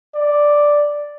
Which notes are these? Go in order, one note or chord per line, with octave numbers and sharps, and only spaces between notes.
D5